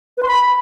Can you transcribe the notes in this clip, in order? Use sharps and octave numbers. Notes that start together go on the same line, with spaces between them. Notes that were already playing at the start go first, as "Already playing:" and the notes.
B4
C6
B5